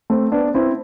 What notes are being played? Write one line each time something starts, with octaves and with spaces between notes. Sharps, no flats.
A3 C4
B3 D4
C4 E4